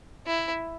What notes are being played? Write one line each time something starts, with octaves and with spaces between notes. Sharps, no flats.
E4